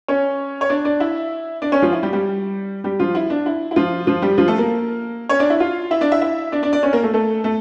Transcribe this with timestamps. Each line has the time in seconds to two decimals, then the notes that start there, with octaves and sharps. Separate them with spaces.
0.08 C#4 C#5
0.61 C#5
0.69 D4 D5
0.85 D4 D5
1.00 E4 E5
1.62 D4 D5
1.72 C#4 C#5
1.82 F3 F4
1.93 E4
2.03 G3 G4
2.13 G3 G4
2.84 G3 G4
3.00 F3 F4
3.15 E4
3.30 D4
3.46 E4
3.71 E4
3.76 F3 F4
4.07 F3 F4
4.22 G3 G4
4.38 F3 F4
4.48 A3 A4
4.58 A#3 A#4
5.29 C#4 C#5
5.40 D4 D5
5.50 E4 E5
5.60 F4 F5
5.91 E4 E5
6.01 D4 D5
6.11 E4 E5
6.21 E4 E5
6.52 D4 D5
6.63 D4 D5
6.73 D4 D5
6.83 C#4 C#5
6.93 A#3 A#4
7.03 A3 A4
7.14 A3 A4
7.44 A3 A4